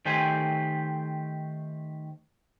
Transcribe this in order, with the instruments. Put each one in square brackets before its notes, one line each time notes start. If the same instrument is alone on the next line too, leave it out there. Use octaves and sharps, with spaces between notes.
[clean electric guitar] D#3 A3 G4 C5 G#5